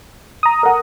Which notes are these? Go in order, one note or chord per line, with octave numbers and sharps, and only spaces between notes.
A#5 D#6
A#4 F#5